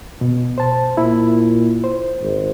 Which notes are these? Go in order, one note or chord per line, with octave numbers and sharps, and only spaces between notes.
B2
C5 A5
A#2 E4
C5
G#1